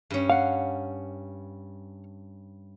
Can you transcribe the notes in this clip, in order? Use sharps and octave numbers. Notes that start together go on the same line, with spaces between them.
G2 C#4
F5 F#5